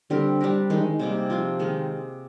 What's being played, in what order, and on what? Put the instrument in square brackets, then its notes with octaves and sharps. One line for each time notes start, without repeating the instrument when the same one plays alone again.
[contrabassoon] D3 [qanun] G3 C4 G4 A#4
[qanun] G3 D4 G4 A#4
[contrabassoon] D#3 [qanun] G#3 D#4 G#4
[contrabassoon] D#3
[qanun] C3 G3 A#3
F3 C4 F4 G#4
D#3 G#3 D#4 G#4